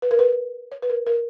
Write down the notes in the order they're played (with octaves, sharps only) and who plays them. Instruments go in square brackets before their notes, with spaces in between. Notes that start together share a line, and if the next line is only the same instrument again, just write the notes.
[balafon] B4
A#4
B4
C#5
B4
A#4
A#4